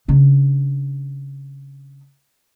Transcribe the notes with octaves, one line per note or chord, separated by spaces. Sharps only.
C#3 D4